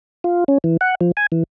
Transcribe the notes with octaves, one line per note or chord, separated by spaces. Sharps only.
F4
C#4
E3
F#5
F3
G#5
E3